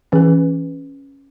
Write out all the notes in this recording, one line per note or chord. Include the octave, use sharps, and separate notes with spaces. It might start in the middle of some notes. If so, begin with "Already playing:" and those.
E3 C#4 G#4 B4